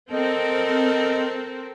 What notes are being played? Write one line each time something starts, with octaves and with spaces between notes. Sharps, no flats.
C4 A4 A#4 D#5